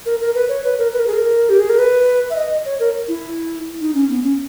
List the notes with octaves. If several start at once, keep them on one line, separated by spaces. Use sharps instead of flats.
A#4
A#4
B4
C#5
B4
A#4
B4
A#4
G#4
A#4
G4
G#4
A#4
B4
E5
D#5
C#5
A#4
E4
D#4
C#4
B3
C#4